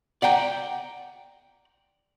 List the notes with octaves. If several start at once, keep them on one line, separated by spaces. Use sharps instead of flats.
D5 F#5 G5 A#5